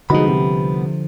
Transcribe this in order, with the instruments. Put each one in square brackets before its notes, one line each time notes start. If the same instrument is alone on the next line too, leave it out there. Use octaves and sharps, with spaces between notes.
[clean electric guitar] C2 B3 B5 [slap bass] D3 F3 [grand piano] G#3 D#4 F#4
[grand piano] C3